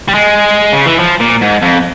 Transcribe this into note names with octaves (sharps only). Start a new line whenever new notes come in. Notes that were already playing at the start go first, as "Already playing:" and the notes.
G3
G#3
C#3
E3
F3
A#2
G#2
F2